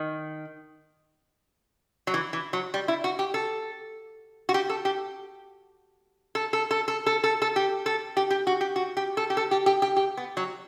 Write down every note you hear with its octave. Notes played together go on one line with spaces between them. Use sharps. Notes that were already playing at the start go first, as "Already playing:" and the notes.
Already playing: D#3
F#3
E3
E3
F#3
G3
E4
F#4
G4
A4
F#4
G4
A4
G4
A4
A4
A4
A4
A4
A4
A4
G4
A4
G4
G4
F#4
G4
F#4
G4
A4
G4
A4
G4
G4
G4
G4
B3
F#3